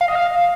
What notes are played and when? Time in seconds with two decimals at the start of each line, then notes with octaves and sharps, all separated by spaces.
0.01 F5
0.08 D#5
0.15 F5